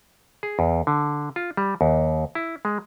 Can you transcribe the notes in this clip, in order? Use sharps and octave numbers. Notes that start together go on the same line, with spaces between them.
G#4
E2
D3
F4
G3
D#2
E4
G#3